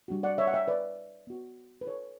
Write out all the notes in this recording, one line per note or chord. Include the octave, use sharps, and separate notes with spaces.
G3 D4 F#4
D5 F#5
C#5 E5
F#5
E5 G5
B4 D5
B3 F#4
B4
A4 C#5